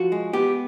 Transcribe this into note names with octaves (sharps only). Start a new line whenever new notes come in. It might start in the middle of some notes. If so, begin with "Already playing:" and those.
Already playing: F3 F#4
G#3
B3 G4